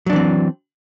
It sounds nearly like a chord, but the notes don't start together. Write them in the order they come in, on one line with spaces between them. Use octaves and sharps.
F#3 D4 E3 C4